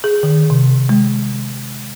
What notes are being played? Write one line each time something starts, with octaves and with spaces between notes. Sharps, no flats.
G#4
D#3
C3
G#3